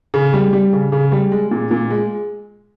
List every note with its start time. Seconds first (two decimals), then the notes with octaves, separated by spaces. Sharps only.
0.14 C#3
0.34 G3
0.53 G3
0.73 C#3
0.92 C#3
1.12 G3
1.32 G#3
1.51 A#2
1.71 A#2
1.91 G#3